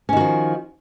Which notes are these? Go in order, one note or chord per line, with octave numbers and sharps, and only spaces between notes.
D#3 F3 C#4 F#4